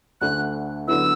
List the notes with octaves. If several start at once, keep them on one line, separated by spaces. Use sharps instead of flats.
D2 D3 A3 F#6
D3 F#3 B3 E4 E6